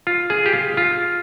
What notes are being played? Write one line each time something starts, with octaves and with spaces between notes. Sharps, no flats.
F4
G#4
G4
F4
F4